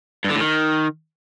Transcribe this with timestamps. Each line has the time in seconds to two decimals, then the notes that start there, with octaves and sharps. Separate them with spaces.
0.24 G2
0.30 D3
0.35 A2
0.40 D#3